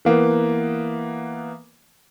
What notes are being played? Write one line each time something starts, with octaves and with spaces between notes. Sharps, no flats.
E3 A#3 B3